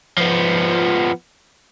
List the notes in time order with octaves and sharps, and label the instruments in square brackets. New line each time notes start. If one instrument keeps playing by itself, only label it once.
[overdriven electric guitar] F3 B3